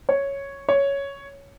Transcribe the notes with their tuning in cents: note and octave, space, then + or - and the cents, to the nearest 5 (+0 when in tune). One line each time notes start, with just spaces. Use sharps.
C#5 +0
C#5 +5